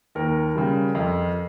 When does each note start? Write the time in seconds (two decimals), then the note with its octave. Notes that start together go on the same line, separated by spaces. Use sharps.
0.15 D#2 A#4
0.56 C#3 G3
0.95 F2